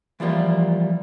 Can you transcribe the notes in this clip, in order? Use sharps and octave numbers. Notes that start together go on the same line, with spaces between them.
E3 F3 G3 A#3